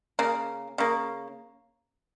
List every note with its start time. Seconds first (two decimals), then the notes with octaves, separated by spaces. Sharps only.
0.19 C#3 A#3
0.78 C#3 A#3